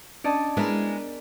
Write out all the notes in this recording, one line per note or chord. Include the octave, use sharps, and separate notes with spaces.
C#4 D4 D5 D#5 A5
G#3 B3 D4 E4 G#4 A#4 B4